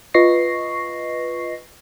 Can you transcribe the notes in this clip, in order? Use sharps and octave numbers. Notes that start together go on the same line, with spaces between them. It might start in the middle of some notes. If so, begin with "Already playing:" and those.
F4 B4 D#5 C#6 A#6 C7